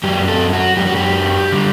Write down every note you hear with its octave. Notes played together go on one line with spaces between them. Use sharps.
F#2 F#3 G4
A4
F#4
F#2 F#3 G4
F#4
G4
D3 G3